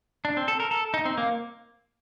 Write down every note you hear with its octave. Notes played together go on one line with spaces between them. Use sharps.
D4
C4
A4
A#4
A4
D#4
C4
A#3